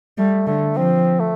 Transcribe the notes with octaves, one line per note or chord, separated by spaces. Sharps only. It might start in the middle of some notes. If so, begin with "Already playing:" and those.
G3 A3
D3 A3
F3 C4
A3